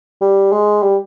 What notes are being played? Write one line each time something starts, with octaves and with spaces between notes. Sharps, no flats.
G3
G#3
G3